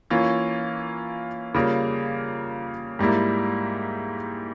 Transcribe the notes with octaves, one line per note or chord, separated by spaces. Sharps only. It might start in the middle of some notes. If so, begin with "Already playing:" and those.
E3 A#3 C#4 F4
C#3 G3 A#3 F4
G#2 G3 A#3 E4